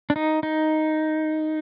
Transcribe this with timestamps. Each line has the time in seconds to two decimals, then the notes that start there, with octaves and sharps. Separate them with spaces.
0.10 D4
0.16 D#4
0.43 D#4